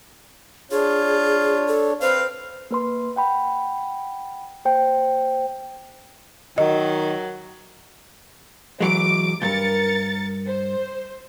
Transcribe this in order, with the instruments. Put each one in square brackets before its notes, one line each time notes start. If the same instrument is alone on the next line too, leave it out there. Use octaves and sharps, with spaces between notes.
[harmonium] D4 C#5 [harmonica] F4 [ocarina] G#4
[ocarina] A4
[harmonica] C4 B4 F5 [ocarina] C5
[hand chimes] A#3 B4 C6
F#5 G5 B5
A#3 C5 G5
[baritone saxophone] D#3 [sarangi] F#3 [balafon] D#5
[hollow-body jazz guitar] E3 F#3 G#3 [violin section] D6 D7
[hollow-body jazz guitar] C#2 G2 [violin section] A#4 A6 C#7
[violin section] C5